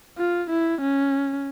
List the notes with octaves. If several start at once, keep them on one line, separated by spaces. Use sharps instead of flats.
F4
E4
C#4